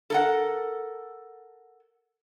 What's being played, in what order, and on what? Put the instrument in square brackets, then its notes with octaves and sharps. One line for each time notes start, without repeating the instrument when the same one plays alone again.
[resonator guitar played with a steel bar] A4 A#4 F#5